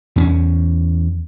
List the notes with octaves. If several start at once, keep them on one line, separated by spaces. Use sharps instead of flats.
E2 C4 C#4